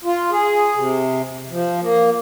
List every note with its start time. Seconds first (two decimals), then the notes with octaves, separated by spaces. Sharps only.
0.04 F4
0.31 G#4
0.76 C3
1.50 F3
1.81 A#3